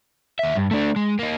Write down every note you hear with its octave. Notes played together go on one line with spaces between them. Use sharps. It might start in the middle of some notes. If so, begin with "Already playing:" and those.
D#2 E5
G2
A3 D4
G#3
A#3 D#4